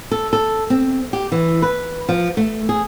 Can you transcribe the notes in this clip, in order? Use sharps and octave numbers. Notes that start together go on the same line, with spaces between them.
A4
A4
C4
G4
E3
B4
F3
A3
G#4